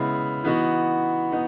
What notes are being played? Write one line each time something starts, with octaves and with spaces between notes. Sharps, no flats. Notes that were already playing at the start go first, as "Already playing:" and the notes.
Already playing: C#3 G#3 B3 E4
E3 B3 D#4 F#4
B3 D#4